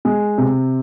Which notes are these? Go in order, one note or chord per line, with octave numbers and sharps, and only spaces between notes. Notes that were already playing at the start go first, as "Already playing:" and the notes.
G#3
C3